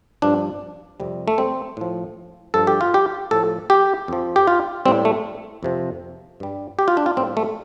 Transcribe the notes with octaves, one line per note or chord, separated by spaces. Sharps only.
G2 F3 D4
F2 C3 G3
A3
C4
A2 F3
G2 F3 A4
G4
F4
G4
A2 F3 A4
G4
F2 F3
G4
F4
A2 G3 C4
A3
F2 C3 F3
G2 G3
G4
F4
D4
F4
A2 G3 C4
A3